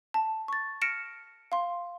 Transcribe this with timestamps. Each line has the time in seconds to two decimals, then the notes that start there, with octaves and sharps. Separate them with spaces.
0.14 A5
0.48 C#6 A6
0.82 F6 A#6 C#7 D7 E7
1.52 F5 C6